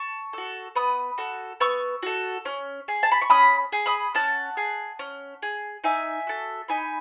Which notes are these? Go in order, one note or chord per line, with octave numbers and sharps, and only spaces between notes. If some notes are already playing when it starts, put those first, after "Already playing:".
Already playing: A5 C#6
F#4 A4
B3 B5 D#6
F#4 A4
B3 C#6 E6
F#4 A4
C#4
G#4
A5
B5
C#6
C#4 B5 D#6
G#4
B5 D#6
C#4 F#5 A5
G#4
C#4
G#4
D#4 E5 G#5
F#4 A4
D#4 G#5 B5